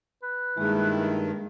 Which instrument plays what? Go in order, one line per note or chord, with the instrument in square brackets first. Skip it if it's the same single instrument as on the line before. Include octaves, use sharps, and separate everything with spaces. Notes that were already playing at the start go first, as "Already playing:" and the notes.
[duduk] B4
[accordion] G2 D#3 [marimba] G#3 A#3 G#4 [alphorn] E4